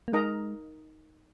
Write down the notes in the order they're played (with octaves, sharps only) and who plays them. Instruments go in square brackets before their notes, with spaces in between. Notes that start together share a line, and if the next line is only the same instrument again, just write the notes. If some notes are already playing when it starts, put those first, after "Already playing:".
[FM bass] A#3
[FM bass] G#3 [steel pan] D#4 A#4 D#5 A#5